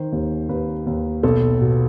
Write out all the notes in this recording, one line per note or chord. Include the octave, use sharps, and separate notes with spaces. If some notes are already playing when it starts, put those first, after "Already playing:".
Already playing: D#3 C5
D#2
D#2 B4
D#2
B1 A4
B2